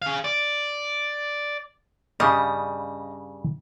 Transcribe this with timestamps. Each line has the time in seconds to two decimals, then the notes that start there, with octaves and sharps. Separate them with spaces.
0.02 G#4 F5
0.25 D5
2.20 G2 C#3 G3 D#5